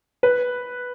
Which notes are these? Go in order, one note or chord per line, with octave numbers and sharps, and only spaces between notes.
B4